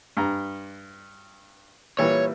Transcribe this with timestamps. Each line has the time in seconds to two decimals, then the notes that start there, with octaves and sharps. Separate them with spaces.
0.17 G2 A#5
1.99 A#2 E3 G3 C#5